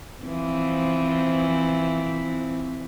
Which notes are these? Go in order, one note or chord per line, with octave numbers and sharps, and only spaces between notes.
E3 F3 C4